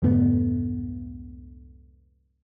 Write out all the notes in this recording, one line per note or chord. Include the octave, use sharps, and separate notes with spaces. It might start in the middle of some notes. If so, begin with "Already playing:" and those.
C2 F2 G#2 D3 A3 B3